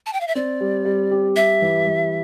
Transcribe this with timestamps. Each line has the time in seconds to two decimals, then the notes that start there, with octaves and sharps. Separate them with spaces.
0.06 A5
0.13 G5
0.21 F5
0.27 E5
0.35 C4 D5
0.61 G3
0.85 G3
1.11 G4
1.36 G3 E5
1.62 E3
1.87 E3